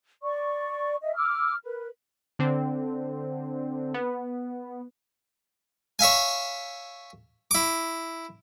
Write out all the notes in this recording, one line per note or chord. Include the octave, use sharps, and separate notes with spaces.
D5 C#6
D#5 E5
D6 E6 F6
A#4 B4
D3 C4
B3
C#5 E5 F5 G#5
E4 D6